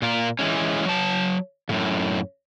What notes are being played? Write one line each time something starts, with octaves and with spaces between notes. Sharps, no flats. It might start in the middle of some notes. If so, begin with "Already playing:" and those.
A#2 F4 A#4
E3 G#3 C#4
F#3 A5
F#2 A2 C#3